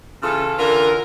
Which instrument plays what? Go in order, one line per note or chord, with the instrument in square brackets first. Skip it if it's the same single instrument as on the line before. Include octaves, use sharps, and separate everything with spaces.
[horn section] C#3 E3 F4 A4
D3 E3 F4 A#4